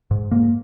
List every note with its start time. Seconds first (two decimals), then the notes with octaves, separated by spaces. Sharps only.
0.11 G#2
0.31 G#2 A#3